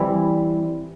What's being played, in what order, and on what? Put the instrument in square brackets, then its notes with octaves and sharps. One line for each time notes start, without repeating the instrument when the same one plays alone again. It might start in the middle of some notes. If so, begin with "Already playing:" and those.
Already playing: [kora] E3 G3 C4 E4